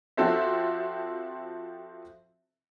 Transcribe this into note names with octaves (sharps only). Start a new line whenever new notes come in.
F3 C4 F#4 A4 C5 E5